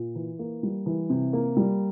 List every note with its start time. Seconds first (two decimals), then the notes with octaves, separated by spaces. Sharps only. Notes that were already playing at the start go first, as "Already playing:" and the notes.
Already playing: A#2
0.15 E3
0.39 A#3
0.63 G3
0.86 E3
1.10 C3
1.33 A#3
1.57 G3